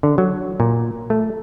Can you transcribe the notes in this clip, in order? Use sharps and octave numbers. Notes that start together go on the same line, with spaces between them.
D3
F#3
A#2
A3